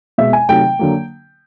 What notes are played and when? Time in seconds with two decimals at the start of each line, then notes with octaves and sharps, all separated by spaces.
0.18 B2 G#3 E5
0.33 G#5
0.49 C3 D#3 F#3 A3 G5
0.79 D3 F#3 A#3